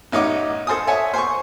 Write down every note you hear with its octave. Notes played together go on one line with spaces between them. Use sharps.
A1 D#4 C#5 D#5 F#5 D6
A4 C5 G#5 D#6
C#5 E5 F#5 G#5 A5
C5 G#5 C#6